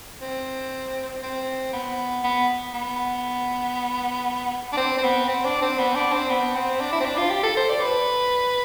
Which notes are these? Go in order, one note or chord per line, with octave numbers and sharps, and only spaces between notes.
C4
C4
B3
B3
B3
D4
C4
C4
B3
C4
D4
C4
B3
D4
C4
B3
C4
D4
E4
C4
D4
F4
G4
A4
C5
D5
B4